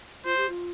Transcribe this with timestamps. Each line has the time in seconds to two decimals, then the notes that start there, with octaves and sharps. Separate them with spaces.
0.25 F4 C5
0.37 G4
0.49 F4